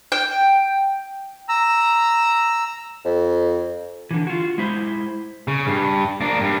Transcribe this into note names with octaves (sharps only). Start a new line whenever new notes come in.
G5
A#5 E6
F2
D3 E3
F4 F#4
G#3 E4 C5
C#3
G2
A#3 D4
G2